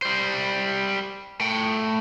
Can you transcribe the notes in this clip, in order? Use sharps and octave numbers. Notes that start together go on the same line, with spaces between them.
G3 C5
A3 G5